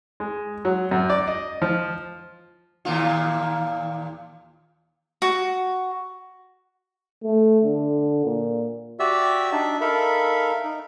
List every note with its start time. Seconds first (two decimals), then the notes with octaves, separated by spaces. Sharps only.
0.20 G#3
0.65 F#3
0.91 F#2
1.10 D5
1.28 D#5
1.62 F3
2.85 D#2 A#2 F4
5.22 F#4
7.23 A3
7.64 D3
8.25 A#2
9.00 F#4 G4 D5 E5 E6
9.52 D4 D#4 D5 E5
9.81 D#4 A4 A#4 E5 F5 B5
10.64 D#4